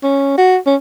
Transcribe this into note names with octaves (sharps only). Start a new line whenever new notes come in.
C#4
F#4
C#4